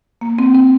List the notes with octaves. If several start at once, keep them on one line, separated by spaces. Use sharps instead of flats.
A#3
C4
C4